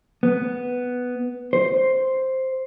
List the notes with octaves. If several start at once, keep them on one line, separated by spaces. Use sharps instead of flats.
B3
C5